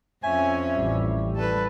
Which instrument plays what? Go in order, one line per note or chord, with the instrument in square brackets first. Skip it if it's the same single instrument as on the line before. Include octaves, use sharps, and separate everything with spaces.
[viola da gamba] F2 C#4 C#5 [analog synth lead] E5 [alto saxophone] G#5
[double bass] A1 [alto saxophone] G3
[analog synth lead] G3 [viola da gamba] A4 B4